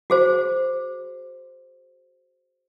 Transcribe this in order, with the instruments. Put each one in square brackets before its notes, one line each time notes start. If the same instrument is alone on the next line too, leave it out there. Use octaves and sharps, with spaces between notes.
[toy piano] F#4 G#4 C5